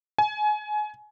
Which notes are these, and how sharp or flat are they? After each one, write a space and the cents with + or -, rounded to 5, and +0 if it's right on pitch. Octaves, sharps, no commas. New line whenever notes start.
G#5 +25